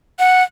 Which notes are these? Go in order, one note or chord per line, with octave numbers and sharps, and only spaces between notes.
F#5